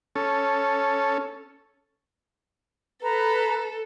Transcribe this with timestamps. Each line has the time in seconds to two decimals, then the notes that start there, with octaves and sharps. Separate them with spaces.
0.15 C#4 A4
3.03 A4 B4 A#5